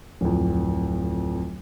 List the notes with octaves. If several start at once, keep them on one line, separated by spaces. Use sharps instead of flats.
D1 F2